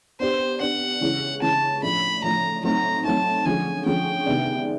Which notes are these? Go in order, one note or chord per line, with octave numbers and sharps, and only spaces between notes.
B3 D4 G4 C5
B3 D4 G4 F#5
C#3 E3 G#3 C#4 E4
C#3 E3 G#3 C#4 E4 A5
A2 F3 A3 D4 B5
A2 F3 A3 D4 A#5
F#3 A3 C4 D#4 A#5
F#3 A3 C4 D#4 A5
D3 F3 G#3 C#4 G#5
D3 F3 G#3 C#4 G5
C3 D#3 G#3 B3 D4